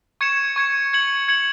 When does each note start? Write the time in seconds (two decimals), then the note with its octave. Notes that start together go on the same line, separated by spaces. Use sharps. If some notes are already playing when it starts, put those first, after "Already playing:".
0.21 C#6 G#6 C#7 E7
0.56 C#6 G#6 C#7 E7
0.93 G#6 C#7 F#7
1.28 G#6 C#7 F#7